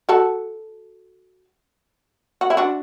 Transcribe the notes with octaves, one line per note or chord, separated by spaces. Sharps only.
F#4 A4
F#4
E4
D4 F#4